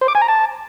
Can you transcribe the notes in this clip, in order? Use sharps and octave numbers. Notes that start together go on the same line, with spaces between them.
C5
D6
G#5
A#5
A5